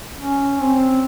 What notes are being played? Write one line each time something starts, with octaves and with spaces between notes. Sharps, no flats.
C#4
C4